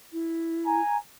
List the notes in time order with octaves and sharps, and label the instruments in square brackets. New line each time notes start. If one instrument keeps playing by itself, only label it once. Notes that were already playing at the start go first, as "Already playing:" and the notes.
[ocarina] E4
[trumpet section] G#5 A#5